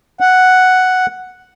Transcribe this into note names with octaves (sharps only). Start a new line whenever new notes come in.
F#5